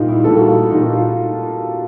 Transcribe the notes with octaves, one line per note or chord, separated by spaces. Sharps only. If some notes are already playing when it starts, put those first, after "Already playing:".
Already playing: A#2 G3 A#3 D#4
E4
A#2 G3 A#3 A4
F#4
F4
A#2 G3 A#3 D#4
D#4
F4